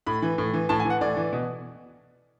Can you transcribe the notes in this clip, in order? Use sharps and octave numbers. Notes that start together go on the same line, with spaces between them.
A2 B5
E3
A2
E3
A2 A5
G#5
E3
F#5
A2 D5
E3
B2